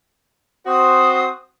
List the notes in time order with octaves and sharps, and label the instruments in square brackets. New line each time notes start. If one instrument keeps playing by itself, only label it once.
[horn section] C4 F#4 C5 [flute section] D#6